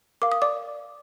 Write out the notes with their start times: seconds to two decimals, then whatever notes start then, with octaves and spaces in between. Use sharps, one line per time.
0.22 A#4 F5 D6
0.32 D#6
0.42 D5 D6